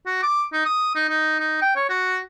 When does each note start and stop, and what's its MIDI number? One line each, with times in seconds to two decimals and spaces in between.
0.06 0.21 66
0.23 0.45 86
0.53 0.64 63
0.66 0.90 87
0.95 1.05 63
1.09 1.37 63
1.40 1.61 63
1.62 1.72 79
1.76 1.89 73
1.89 2.19 66